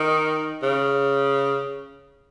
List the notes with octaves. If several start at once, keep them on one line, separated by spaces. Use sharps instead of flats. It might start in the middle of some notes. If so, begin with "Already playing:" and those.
Already playing: D#3
C#3